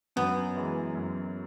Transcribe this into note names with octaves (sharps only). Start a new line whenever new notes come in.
F#2 B3
E3 G#3
F#2